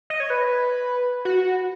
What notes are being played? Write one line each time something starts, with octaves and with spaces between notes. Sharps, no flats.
D#5
C#5
B4
F#4